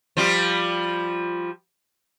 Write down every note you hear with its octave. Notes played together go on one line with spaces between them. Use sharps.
F3 G3 F4